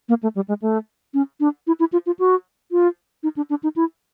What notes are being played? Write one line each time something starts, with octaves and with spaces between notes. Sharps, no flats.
A#3
A3
G3
G#3
A3
C#4
D4
E4
E4
F4
F4
F#4
F4
D#4
D4
D4
D#4
E4